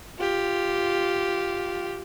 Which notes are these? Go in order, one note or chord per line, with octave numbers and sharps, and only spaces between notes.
F4 G4